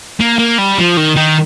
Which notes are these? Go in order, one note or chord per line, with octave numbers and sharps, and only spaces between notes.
A#3
A#3
G3
F3
D#3
D#3